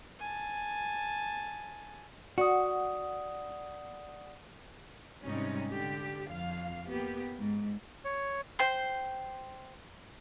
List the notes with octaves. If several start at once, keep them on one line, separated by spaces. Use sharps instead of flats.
G#5 A5
F#4 D5 F#5 D#6
G#2 C3 G3 C#4 D#4
D3 G4
F2 F5
A#3 B3 G4
G#2
C#5
C5 G5 C6